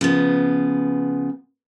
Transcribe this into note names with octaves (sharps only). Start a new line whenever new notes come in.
C#3 F3 B3